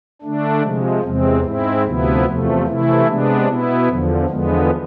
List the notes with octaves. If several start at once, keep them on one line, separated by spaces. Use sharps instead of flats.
D3 A3 D4
C3 F3 G#3
E2 C3 G#3 C4
G#2 G#3 C4 E4
D2 C3 F3 B3 E4
E2 C3 F3 A3
C3 E3 A3 E4
C3 G#3 B3 D4
B2 B3 E4
E2 D3 F3
E2 D3 F3 G#3 B3